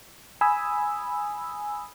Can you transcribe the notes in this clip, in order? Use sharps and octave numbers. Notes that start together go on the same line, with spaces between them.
G#5 B5 D#6 E6